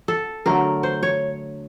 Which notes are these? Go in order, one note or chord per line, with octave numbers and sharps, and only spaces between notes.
A4
D3 F#3 A3 A#4
C5
C#5